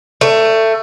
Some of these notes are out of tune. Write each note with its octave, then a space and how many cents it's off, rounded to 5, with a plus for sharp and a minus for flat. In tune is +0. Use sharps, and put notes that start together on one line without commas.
A3 +20